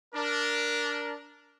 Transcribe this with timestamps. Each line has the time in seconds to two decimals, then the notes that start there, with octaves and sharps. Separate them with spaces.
0.14 D4 A#4